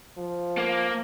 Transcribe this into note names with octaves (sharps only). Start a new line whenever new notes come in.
F3
A#3